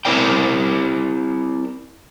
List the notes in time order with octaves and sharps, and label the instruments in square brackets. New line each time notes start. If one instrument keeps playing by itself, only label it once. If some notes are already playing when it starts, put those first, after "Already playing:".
[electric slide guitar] C4 E4 A#4 D5 G5